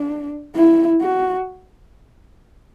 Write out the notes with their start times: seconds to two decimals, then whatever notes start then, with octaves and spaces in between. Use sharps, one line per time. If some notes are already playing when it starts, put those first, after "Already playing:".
Already playing: D4
0.55 E4
1.02 F#4